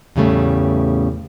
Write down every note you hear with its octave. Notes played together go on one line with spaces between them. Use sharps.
E2 A2 C#3 G3 A3